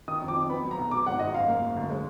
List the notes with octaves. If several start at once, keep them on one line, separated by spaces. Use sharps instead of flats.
D#3 D#6
F2
D6
F2
B3 B5
F#3
A#5
B1
F#3 D6
G#1 F#5
G#2 D#5
F#2 F5
A#3
F#2
D2
G#3